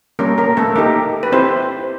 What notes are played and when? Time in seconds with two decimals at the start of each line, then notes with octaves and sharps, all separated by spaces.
0.19 G3 A#3 C#4 A#4
0.38 A#3 A#4
0.57 A3 A4
0.76 A#3 D#4 G4 A#4
1.23 B4
1.32 C4 E4 G4 C5